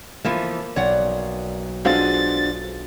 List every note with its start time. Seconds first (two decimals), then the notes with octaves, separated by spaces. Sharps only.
0.24 E3 F3 A#3 B3
0.76 B1 C#5 D5 F#5
1.85 G#3 D4 F4 F#4 A4 C5 F5 A6